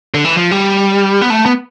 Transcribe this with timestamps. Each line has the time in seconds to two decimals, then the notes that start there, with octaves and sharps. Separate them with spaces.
0.14 D3
0.25 E3
0.37 F3
0.51 G3
1.21 B3
1.30 A3
1.46 B3